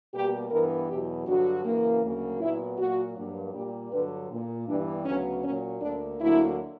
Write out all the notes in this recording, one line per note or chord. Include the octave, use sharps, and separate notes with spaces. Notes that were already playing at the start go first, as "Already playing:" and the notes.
B2 G3 A#3 G4
G2 E3 B3 A#4
E2 B2 F#3 G4
G2 D3 F#3 F#4
F#2 C#3 E3 A#3
D2 C#3 F#3 A#3
A#2 F#3 B3 E4
A#2 F#3 A#3 F#4
G2 F#3 A#3
A#2 G3 A#3 G4
G2 D3 F#3 B4
A#2 A#3
G2 E3 G3 B3 D4
D2 C#3 F#3 B3 C#4
A#2 F#3 A#3 C#4
D2 D3 A#3 D4
D2 D3 F#3 A#3 E4